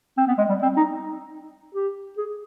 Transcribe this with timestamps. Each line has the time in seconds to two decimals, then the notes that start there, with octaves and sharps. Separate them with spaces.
0.17 C4
0.27 B3
0.38 G#3
0.49 G3
0.62 C4
0.77 D#4
1.75 G4
2.17 G#4